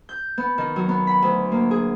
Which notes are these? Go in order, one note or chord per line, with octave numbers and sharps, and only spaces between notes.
G6
B3
D#3
F#3
B3
B5
D2
A#3
G#4